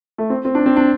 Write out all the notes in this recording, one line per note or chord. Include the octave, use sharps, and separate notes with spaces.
A3
C4
C4
D4
C4
D4